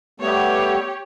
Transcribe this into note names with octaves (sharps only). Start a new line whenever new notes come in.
G3 A3 B3 G4 C#5